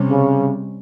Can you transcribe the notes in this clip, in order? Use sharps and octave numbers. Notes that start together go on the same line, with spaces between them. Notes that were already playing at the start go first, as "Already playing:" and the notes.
Already playing: C3 G3 C#4
C#3